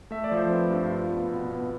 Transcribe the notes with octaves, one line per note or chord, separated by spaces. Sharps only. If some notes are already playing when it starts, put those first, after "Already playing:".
A3 E5
D5
F3
C5
C4 B4
G2
F4
B3
B2 B4
B2